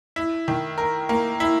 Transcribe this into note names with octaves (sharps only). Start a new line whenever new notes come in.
E4
D#3
A#4
A#3
E4